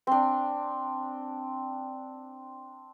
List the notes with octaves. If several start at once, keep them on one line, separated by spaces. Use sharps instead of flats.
C4 D4